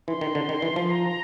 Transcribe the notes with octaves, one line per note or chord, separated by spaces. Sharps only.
E3 C6
D#3
D3
D#3
E3
F3
A#5